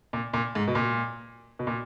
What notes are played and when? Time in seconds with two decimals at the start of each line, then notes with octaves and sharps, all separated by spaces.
0.13 A#2
0.33 A#2
0.55 G#2
0.68 B2
0.75 A#2
1.59 B2
1.67 A#2